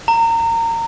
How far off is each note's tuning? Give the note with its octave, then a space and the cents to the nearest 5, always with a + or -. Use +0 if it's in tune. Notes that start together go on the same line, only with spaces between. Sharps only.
A#5 -25